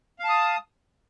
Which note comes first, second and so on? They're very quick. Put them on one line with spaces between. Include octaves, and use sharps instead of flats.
F5 A5 D#6